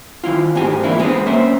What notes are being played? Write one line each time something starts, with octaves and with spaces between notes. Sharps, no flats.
D#3 E4 F4
D2 G#2 C4 G4 G#5
E3 F3 A#3 D4 E4
G#3 B3 C4 G#4
A#3 C#4 C5 E5